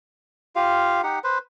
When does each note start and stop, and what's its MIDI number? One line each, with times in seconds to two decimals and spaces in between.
0.56 1.01 65
0.56 1.01 67
0.56 1.01 77
1.03 1.19 63
1.03 1.19 67
1.03 1.19 78
1.24 1.38 71
1.24 1.38 72